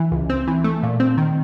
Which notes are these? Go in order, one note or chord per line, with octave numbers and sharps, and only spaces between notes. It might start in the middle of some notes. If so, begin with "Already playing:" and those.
Already playing: E3
C#2
C4
E3
A3
A#2
C4
D#3